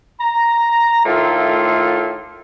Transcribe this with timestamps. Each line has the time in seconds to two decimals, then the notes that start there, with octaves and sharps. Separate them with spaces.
0.21 A#5
1.05 A2 D#3 A3 F4